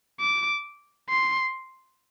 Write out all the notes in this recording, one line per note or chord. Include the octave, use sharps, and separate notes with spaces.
D6
C6